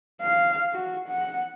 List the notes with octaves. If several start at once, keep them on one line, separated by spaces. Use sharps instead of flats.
F5
F#4
F#5